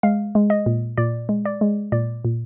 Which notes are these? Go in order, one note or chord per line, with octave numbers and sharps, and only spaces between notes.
G#3 F5
G#3
D#5
A#2
A#2 D5
G#3
D5
G#3
A#2 D5
A#2